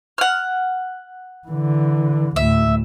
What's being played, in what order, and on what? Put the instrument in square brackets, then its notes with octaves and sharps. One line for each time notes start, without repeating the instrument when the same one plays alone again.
[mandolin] F#5 F6
[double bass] D3 E3
[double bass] D2 A2 [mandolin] E5